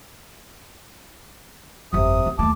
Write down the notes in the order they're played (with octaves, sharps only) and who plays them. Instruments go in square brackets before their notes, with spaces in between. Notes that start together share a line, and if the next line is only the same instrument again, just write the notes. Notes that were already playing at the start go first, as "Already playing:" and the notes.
[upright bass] G1 F2 [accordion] C3 D#6
[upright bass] C4
[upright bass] D#2 A3 [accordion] A5 D6